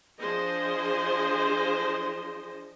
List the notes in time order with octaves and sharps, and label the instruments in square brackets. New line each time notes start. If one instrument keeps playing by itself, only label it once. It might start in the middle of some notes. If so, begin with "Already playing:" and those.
[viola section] F3 D4 G#4 C5 D#5